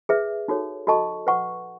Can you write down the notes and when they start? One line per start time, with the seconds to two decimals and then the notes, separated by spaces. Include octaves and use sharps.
0.09 G#4 B4 E5
0.48 D#4 F#4 A4 C#5
0.87 F#4 A4 D#5 A5 C#6
1.27 B4 F#5 C#6